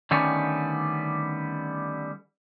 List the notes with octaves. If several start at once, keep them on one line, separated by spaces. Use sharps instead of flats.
D3 D#3 G3 A3 B3 C#4